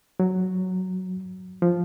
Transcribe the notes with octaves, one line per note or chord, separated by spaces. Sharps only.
F#3
F3